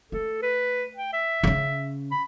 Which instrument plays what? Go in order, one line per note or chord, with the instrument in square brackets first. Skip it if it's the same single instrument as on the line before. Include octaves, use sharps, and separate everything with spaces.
[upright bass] A3 [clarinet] A4
[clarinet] B4
G5
E5
[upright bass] C#3 C#4
[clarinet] B5